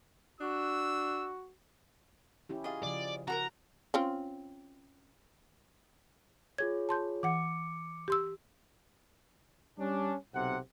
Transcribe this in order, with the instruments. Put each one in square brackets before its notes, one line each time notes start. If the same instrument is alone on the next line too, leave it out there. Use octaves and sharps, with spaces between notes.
[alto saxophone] D4 [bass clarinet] F#4 [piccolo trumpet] E6
[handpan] C#4 E4 G4
[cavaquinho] F4 G#4 D#5
[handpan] C#3 F3 [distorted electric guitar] D5
[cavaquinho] F#4 A4 A#4 [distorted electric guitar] A#5
[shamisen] C4 C#4 F4
[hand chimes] F4 G#4 C#5 [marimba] G#6
[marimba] A5 C6 G6
[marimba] E3 F#5 [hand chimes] D6 C#7
[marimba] G4 C6 E6
[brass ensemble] G3 C#4 D4
B1 C3 F#5